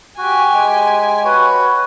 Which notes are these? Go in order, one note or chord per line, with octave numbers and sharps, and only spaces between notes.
F#4 G4 G#5
G#3
F#4 B4 C#5